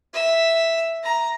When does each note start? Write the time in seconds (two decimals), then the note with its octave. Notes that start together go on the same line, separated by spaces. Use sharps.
0.14 E5
1.04 A#5